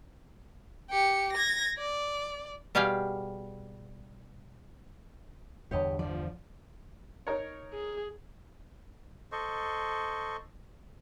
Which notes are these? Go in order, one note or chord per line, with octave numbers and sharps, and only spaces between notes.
G4 C#7
G#6 A#6
D5
B2 G3 G4 G#4 F5 G5
G1 E2 D3 G4 C#5 D#5
F3 D5
D#4 A#4 C#5
G#4
A4 C5 D#5 C#6